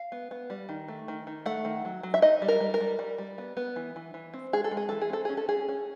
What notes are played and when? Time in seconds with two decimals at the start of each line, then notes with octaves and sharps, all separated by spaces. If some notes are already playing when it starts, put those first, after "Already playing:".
Already playing: F5
0.12 B3
0.31 B3
0.50 G3
0.69 D#3
0.88 A3
1.08 D#3
1.27 D#3
1.46 A3 F#5
1.65 D#3
1.85 F#3
2.03 F#3
2.14 E5
2.22 D#4 D#5
2.42 G3
2.48 A#4
2.60 G3
2.74 A#4
2.81 G3
2.99 G3
3.18 G3
3.38 B3
3.57 B3
3.76 E3
3.96 E3
4.14 E3
4.34 C4
4.53 G#3 G#4
4.64 A4
4.71 G#3
4.77 G#4
4.89 E3 A4
5.01 G#4
5.10 C4 A4
5.25 C#4 G#4
5.37 A4
5.49 C#4 G#4
5.69 C#4